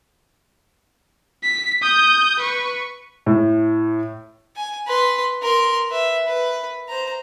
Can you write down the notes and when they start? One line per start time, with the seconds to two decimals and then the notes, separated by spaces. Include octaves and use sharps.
1.43 B6
1.82 D#6 G6
2.40 B4 C#6
3.26 A2
4.56 G#5
4.87 B4 C6
5.42 A#4 C6
5.89 B4 E5
6.27 B4
6.89 C5 A#5